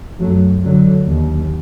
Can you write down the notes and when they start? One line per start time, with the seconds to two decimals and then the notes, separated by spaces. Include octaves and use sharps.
0.19 F#2 F#3 A3
0.63 D3 F#3
1.06 D#2